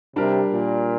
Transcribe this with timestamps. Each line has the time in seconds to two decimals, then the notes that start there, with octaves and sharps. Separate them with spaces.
0.16 C3 G3 D4 G4 A#4
0.52 A#2